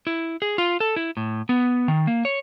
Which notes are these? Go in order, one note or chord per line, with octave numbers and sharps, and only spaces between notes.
E4
G#4
F4
A4
E4
A2
B3
D#3
A#3
C#5